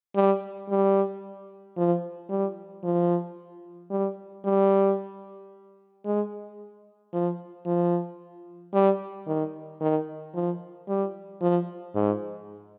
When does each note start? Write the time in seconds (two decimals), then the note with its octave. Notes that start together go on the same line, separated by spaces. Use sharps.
0.16 G3
0.70 G3
1.77 F3
2.30 G3
2.84 F3
3.90 G3
4.45 G3
6.05 G#3
7.13 F3
7.66 F3
8.74 G3
9.27 D#3
9.81 D#3
10.35 F3
10.88 G3
11.41 F3
11.95 G#2